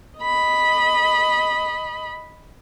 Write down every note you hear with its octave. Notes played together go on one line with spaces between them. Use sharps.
D#5 B5